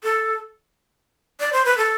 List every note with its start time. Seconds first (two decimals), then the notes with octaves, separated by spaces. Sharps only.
0.03 A4
1.40 D5
1.53 C5
1.65 B4
1.78 A4